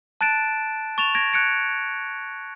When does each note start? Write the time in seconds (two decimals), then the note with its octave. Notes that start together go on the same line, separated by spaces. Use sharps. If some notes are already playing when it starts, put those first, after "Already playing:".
0.21 A5 F#6 A6 D7 E7
0.98 C#6 A6 E7 F7
1.15 G#6 A#6 D7
1.33 F#6 G#6 C#7 D7